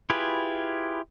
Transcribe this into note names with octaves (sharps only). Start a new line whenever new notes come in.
E4 F4 G4 G#4 B4